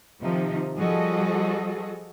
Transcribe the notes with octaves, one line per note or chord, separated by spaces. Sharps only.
C3 D#3 F3 D#4
F3 G3 F#4 G#4 A4 D#5